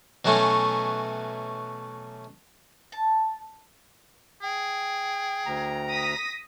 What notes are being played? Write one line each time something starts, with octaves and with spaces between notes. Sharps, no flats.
B2 E3 F#3 A3 C#4
A5
G#4 G5
D2 A#5
D#6 A#6 B6